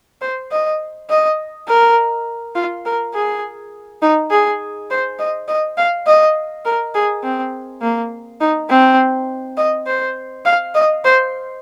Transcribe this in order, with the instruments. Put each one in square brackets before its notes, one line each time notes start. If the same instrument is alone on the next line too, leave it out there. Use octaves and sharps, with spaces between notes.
[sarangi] C5
D#5
D#5
A#4
F4
A#4
G#4
D#4
G#4
C5
D#5
D#5
F5
D#5
A#4
G#4
C4
A#3
D#4
C4
D#5
C5
F5
D#5
C5